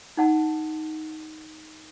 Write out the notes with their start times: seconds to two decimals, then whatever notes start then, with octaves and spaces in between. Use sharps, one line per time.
0.17 D#4 F#5 A5